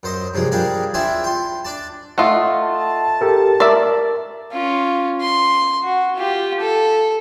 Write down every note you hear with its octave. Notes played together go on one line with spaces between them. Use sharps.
F#2 C5 D#5
G2 C3 F3 G#3
G3 D4 G#4 A#4 F5
C4 D4 E4 F4 E5 G#5
G5 C6
D4 D5 A5
A3 F4 D#5 F#5
A5
G4 A4 A#4
A#4 D5 E5
C#4 F4
C6
F#4
F4 G4
A4